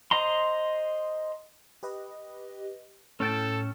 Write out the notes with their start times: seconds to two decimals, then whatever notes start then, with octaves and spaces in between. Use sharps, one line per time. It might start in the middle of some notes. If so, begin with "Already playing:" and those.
0.11 C5 D#5 A#5 C6
1.83 G4 B4 D#5
3.20 A2 C#4 A4 G5 A5